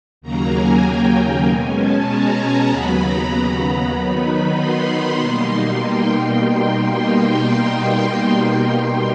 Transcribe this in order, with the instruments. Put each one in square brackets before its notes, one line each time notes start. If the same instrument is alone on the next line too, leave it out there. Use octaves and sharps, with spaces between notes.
[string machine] D#2 C#3 F#3 A#3 A#5
G#5
G5
B2 G#3 C#4 G#5
A5
A#5
D#2 C#3 F#3 B3 B5
A#5
B5
B5
D#3 F#3 B3 D#4 B5
C6
B2 G3 A#3 D#4
G5